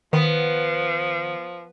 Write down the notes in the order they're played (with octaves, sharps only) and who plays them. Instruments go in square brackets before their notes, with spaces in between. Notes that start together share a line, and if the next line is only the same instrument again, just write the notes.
[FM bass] D#3 [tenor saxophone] F3 [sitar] B3